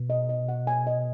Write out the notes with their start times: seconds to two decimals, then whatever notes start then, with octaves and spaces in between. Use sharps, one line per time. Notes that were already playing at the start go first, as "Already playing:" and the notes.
Already playing: B2
0.10 D#5
0.29 D#5
0.49 F#5
0.67 G#5
0.87 D#5